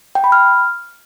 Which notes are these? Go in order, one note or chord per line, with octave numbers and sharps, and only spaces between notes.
G5
B5
F6